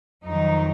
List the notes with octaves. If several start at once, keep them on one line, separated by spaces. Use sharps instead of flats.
F2 D#3 F#3 D#4